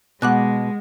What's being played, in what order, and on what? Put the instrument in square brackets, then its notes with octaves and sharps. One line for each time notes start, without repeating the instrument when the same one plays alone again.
[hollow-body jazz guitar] B2 [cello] G#3 [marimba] F#5 D6 F#6